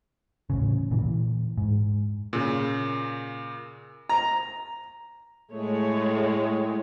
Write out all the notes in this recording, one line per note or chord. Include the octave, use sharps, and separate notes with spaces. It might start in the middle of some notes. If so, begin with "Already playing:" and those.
D#1 A1 C#3
A#2 E3
G#2
A#2 C#3
A#5
A2 G#3 A3 C#5